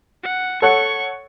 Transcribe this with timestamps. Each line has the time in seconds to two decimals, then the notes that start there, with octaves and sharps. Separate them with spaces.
0.23 F#5
0.62 A4 C#5 F#5 C#6